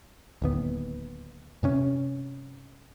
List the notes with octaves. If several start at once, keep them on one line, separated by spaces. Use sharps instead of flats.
D1 D#2 B3
G2 C3 C#4